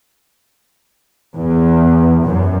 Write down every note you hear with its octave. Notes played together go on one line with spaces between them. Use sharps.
E2
F#2